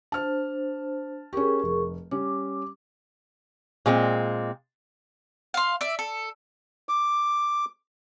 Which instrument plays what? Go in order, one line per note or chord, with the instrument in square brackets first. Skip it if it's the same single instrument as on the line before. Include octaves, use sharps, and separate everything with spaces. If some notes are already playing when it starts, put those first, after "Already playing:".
[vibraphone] D4 C5 [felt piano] A5 F6
[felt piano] C#4 G4 [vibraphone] G#4 A#4 C#6
[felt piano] F1
[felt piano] G3 C#4 [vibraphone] D6
[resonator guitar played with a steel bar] A#2 G#3 C4
[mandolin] F5 C6
D5 E5
A4
[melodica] D6